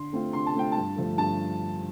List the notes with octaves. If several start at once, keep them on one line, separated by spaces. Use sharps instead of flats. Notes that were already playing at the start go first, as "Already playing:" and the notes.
Already playing: D3 C6
A3 C4 F4
D3 C6
A5
A3 C4 F4 G5
G2 A5
D3 F3 A3
G2 A5